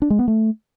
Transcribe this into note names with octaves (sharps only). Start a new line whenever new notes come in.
D4
G#3
B3
A3